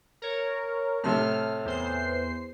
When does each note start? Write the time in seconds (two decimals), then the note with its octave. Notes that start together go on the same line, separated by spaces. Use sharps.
0.22 A#4 C#5
1.04 A2 C3 A4 F6
1.65 E2 C5 C7